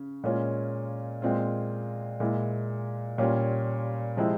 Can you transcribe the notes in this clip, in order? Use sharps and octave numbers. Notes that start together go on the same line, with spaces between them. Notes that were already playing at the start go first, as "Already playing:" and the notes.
Already playing: C#3
A#2 G#3 C#4 F4
A#2 G#3 C4 F4
A#2 G#3 E4
A#2 G3 C#4 F4
C3 F3 G#3 C4 E4